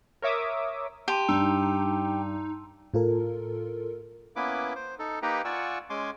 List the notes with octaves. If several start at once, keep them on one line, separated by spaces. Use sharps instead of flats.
A#4 C#5 E5 D6 D#6
G4 A5 C6 D#7
G2 D#4 E6
A2 F4 A4 A#4
A#3 B3 C#4 E4 B4 D6
C5
D#4 A4
A#3 D#4 G4 B4 G5 A#5
F4 D5 F#5 G#5 C#6 E6
G#3 C#4 G#5 C6 D6